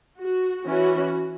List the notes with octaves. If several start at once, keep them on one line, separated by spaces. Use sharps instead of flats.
F#4
E3 C#4 F#4